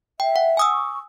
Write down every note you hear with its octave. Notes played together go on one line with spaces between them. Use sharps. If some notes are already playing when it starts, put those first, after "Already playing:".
E5 G5
F#5
G#5 D#6 E6
C#6